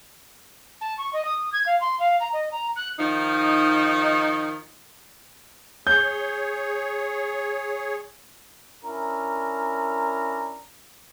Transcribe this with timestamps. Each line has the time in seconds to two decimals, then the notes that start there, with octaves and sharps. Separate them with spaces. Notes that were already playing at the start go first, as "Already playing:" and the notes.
0.81 A5
0.98 C#6
1.13 D#5
1.25 D#6
1.52 G#6
1.66 F5
1.81 C6
1.99 F5
2.20 A#5
2.33 D#5
2.51 A#5
2.76 F#6
2.99 D#3 F3 D#4
5.87 G#4 C#5 G6
8.85 C#4 D4 E4 A#4 A#5